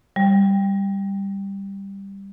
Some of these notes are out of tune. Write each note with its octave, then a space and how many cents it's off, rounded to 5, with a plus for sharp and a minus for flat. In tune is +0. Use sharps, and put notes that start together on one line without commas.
G3 +5